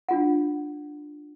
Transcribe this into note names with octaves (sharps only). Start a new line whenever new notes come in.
D4 F4 F#5